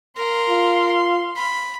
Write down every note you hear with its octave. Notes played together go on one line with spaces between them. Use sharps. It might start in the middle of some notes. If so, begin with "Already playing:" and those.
A#4 F5 C6
F4
B5